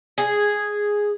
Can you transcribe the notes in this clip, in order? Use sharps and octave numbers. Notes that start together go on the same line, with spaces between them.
G#4